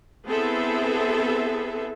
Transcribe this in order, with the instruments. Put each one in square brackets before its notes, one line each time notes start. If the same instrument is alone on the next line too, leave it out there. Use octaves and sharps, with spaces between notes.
[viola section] B3 C4 E4 G#4 A4 E5